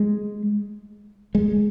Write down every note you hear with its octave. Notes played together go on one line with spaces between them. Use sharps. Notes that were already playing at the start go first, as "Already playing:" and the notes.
Already playing: G#3
G#3